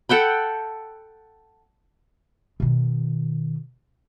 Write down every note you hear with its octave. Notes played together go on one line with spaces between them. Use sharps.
A4 F#5 G5 B5
B2 D#3